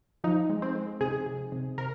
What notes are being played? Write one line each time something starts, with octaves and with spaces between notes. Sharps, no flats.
F3 D#4
G#3
C4
G#3
C3 G#4
C3
C3
C3 A#4